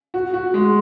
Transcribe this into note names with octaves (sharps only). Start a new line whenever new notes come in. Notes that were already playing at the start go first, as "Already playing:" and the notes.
F#4
F#4
G#3